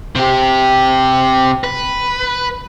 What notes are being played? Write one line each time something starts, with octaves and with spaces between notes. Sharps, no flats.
C3 G4
B4